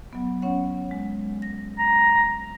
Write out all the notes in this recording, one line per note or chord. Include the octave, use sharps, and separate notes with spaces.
F#3 B3
C#4 C#5 F#5
G#3
A#6
A#5